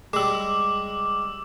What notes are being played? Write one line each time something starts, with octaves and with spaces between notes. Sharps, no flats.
G3 G#3 D6 E6